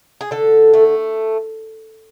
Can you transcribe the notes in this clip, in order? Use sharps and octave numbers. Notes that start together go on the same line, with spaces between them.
G#4
D3 A4
A3